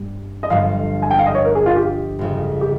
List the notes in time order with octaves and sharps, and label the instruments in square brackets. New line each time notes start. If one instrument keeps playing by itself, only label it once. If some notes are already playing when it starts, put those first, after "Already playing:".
Already playing: [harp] G2 G3
[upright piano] D#5
[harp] G1 G2 F3 [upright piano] F5
[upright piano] G#5
G5
F5
D#5
C#5
A#4
G#4
F4
G4
[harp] G1 F2 C#3
[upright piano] G4